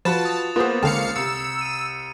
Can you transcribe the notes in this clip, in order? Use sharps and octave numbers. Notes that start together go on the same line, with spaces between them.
F3 F4 F#4 B4 A5 B5 A6 E7
D#6 A6
A#3 B3 F4 G#4 C5
C#2 D3 C4 F5 A5 C#7
C2 E6 C#7
D#7